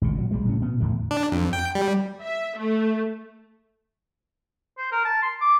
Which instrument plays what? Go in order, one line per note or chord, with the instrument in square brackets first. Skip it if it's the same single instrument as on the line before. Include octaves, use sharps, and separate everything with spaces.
[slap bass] G#1 C#2 B2
A#2 F#3
B1 G3 G#3
A2 C#3 C#4
B2 B3
E2 A2 D3 D#3
[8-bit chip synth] D4
F2
G5
G3
[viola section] E5
A3
[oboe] C5
A#4
A5
C6
D6